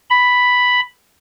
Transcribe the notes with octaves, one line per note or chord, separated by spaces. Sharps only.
B5